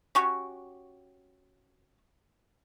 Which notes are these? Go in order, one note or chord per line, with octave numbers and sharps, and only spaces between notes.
C#4 F#4 G4